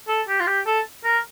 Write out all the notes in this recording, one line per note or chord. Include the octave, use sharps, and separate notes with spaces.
A4
G4
F4
G4
A4
A#4